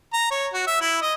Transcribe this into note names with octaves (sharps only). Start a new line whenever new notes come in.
A#5
C#5
F#4
E5
E4
D#5